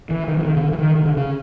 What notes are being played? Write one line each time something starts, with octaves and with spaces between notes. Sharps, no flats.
E3
D#3
E3
D#3
C#3
D3
E3
D#3
D#3
D3
C#3